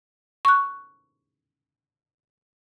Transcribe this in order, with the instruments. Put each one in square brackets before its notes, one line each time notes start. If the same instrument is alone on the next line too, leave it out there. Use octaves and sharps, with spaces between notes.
[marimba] C#6 F#6